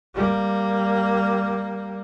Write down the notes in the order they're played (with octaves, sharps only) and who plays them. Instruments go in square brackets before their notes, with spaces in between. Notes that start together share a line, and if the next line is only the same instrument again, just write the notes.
[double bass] G3 A#3